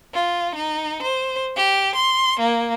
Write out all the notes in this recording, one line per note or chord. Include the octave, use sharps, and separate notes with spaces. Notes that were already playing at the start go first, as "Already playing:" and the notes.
F4
D#4
C5
G4
C6
A#3